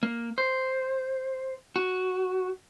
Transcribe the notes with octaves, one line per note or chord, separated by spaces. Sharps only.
A#3
C5
F#4